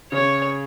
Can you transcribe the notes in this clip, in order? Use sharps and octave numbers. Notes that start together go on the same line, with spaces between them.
C#3 C#5